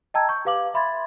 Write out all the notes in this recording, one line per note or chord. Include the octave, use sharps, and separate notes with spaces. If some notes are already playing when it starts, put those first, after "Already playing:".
D#5 G5 A5 A#5 E6 G#6
C#6 G6
G4 B4 F5 D6 F#7
E5 B5 C6 G#6 A6